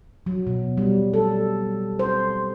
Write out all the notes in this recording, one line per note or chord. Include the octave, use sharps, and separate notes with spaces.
F#3
B2
G3
A4
C5